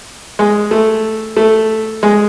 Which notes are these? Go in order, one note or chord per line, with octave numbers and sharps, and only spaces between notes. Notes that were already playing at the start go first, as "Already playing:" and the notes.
G#3
A3
A3
G#3